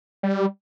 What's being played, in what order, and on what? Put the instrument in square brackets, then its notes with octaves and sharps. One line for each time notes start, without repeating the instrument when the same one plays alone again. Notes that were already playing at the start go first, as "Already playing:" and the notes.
[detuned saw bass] G3